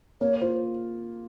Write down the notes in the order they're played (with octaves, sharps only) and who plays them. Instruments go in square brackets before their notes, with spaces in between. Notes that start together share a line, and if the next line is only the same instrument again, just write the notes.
[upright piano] A#3 [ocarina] C#5
[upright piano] F4 [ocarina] C5